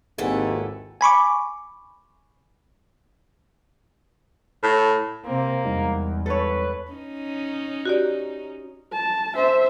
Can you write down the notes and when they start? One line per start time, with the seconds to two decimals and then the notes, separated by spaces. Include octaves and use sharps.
0.18 G#1 D#2 E4 G#4 A4 B4 F#5 G#5
1.01 G#5 B5 C#6 D6
4.64 A2
5.25 C3 A#3 C4
5.65 E2 G3 G#3 D#4
6.26 A4 B4 C#5
6.91 C#4 D#4
7.85 F#4 G4 D5
8.92 A5
9.35 C5 E5